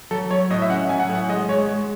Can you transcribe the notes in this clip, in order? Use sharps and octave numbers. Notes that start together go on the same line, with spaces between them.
F#3 A4
F#3 C#5
A2 D#5
E5
C#4 F#5
F#3 G#5
F#5
A2
F#5
G#3 D#5
G#3 C#5
G#3